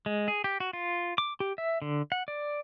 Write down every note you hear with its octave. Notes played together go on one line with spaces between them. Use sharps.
G#3
G#4
G4
F#4
F4
D6
G4
E5
D3
F#5
D5